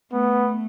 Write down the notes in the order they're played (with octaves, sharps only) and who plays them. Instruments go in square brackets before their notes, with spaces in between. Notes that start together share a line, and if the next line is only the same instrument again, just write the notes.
[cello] A3 [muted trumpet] B3